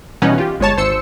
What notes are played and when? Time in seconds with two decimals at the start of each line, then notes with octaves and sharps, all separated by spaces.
0.22 B2 E3 G3 C#4 D#4 F#5
0.38 F4 G4
0.60 G1 G#3 C#5 A5
0.77 G#1 C5 E6 C#7